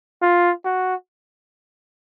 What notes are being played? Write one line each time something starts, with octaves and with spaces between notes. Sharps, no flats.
F4
F#4